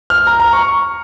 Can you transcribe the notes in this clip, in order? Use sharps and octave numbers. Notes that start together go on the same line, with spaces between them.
F6
A#5
A#5
C#6